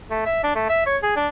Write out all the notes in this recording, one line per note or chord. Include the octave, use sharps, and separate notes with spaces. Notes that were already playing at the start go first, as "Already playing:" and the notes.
A3
E5
D4
A3
E5
C#5
G#4
D4